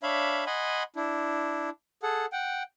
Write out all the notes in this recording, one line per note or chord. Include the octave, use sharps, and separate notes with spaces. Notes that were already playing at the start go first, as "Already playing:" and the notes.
D4 C#5 E5 F5 B5
D#5 F#5 G#5 B5 C6
D4 E4
G#4 A4 F#5
F#5 G5